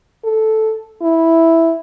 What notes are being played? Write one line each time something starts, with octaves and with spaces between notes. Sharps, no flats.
A4
E4